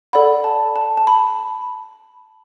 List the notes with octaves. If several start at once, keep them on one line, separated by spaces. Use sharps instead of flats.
A4 D5 F#5 B5
A5
A5
A5
B5